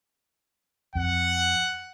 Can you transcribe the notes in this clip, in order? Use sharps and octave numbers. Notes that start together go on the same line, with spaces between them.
F2 F#5